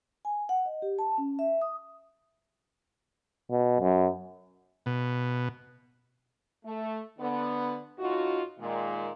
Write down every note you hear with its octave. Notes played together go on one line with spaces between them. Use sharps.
G#5
F#5
D#5
G4
A5
C#4
E5
D#6
B2
F#2
B2
A3
D3 B3
A2 D#4 F4 F#4
A#2 D#3 G#3